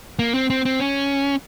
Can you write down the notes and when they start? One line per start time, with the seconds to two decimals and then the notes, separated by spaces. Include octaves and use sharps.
0.19 A#3
0.34 C4
0.50 C4
0.65 C4
0.80 C#4